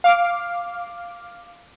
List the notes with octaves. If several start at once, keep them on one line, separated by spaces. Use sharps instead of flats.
F5 D6